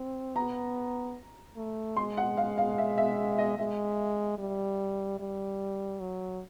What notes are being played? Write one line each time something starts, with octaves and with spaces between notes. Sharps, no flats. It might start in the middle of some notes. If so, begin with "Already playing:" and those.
Already playing: C4
B3 A#5
A3
G#3 C6
F#5
F5
F5
E5
E5
D#5
G#3 E5
G3
G3
F#3